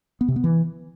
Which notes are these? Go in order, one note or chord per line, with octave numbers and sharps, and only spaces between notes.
B3
C3
B3
E3